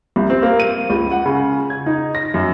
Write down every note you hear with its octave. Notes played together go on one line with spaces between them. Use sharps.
C2
C4
A#3
D#7
C#2
F#5
C#3
G#6
D#4
A#6
F#2